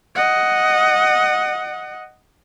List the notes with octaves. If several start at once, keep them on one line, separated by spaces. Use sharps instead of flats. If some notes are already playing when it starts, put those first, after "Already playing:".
D#5 F#5